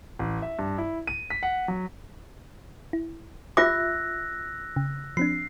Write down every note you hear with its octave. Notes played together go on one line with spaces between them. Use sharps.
A1
E5
G2
E4
D#7
B6
F#5
F#3
E4
F4 G4 E5 D6 E6 F#6 A#6
C#3
F3 C4 D4 C7